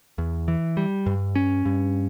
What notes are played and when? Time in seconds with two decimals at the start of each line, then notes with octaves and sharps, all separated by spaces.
0.18 E2
0.48 E3
0.77 G3
1.06 G2
1.35 C#4
1.65 G2